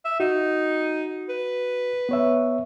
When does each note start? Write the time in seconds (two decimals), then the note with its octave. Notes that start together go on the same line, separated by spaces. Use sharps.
0.05 E5
0.20 D#4 F#4
1.29 B4
2.09 B3 C#5 E5